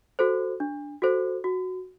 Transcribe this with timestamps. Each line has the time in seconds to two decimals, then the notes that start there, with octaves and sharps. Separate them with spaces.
0.19 F#4 A4 C5
0.60 D4
1.02 F#4 A4 C5
1.44 F#4